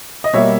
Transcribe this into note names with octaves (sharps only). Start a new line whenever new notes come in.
D#5
B2 G3 A#3 C#5 E5